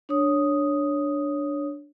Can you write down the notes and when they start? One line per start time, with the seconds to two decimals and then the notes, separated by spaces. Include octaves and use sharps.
0.09 D4 C#5 D#6